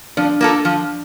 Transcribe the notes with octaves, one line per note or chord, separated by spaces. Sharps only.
F3 D4
A#3 F4 A4
F3